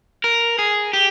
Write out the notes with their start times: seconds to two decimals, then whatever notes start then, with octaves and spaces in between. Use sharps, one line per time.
0.24 A#4
0.59 G#4
0.93 G4